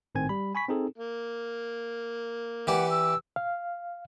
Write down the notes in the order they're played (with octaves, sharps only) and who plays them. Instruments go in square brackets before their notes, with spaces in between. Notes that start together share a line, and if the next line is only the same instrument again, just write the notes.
[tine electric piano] G#1 A2 D#3 C4 G#5 G#6
G3 B5
G#5 B5 C#6 B6
C4 D#4 G#4 A4
[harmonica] A#3
[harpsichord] E3 G4 D5 [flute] F#5
[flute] E6
[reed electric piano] F5